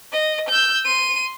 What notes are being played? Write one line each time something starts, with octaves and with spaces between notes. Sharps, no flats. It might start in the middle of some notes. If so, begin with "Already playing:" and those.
D#5
E6 G6
C6 D#7